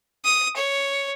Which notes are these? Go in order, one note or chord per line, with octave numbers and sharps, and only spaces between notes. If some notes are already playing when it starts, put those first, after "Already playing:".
D#6
C#5